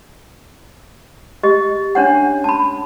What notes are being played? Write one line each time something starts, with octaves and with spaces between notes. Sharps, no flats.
G4 D#5
C#4 D4 C#5 F#5
A5 B5